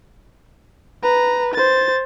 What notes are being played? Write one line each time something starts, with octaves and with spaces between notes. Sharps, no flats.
B4 A#5
C5 A6